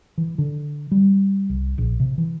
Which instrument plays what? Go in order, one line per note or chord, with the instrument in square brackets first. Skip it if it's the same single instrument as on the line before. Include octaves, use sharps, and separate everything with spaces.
[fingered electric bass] E3
D3
G3
C2
A#1
C3
E3